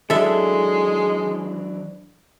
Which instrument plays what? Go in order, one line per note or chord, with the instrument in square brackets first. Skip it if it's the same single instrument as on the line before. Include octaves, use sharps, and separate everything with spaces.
[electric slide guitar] E3 F#3 D4 [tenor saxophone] G#3 [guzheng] A4 E5